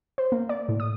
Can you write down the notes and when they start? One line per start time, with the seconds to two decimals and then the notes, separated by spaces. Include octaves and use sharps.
0.18 C5
0.32 A#3
0.49 D5
0.69 A2
0.80 D#6